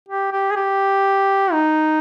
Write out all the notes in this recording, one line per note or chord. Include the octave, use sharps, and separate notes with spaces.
G4
G4
G#4
G4
D#4